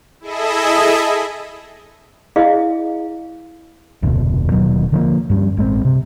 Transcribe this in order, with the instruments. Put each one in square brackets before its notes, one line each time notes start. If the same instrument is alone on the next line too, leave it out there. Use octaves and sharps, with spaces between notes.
[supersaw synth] E4 G#4 A4 D#5 E5
[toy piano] E4 G#4 D#5 F5
[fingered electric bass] F1 D2 B2
D#1 D#2 B2 F#3
D3 F3 G#3 A#3
G2 G3 C#4
A1 G#3 A#3 C4
C3